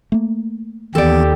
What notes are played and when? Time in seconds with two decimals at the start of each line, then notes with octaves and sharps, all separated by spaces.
0.12 A3 A#3
0.95 D#2 E3 B3 G4 A4 D5